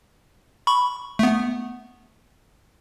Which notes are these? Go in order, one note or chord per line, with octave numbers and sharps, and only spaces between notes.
B5 C#6
A3 B3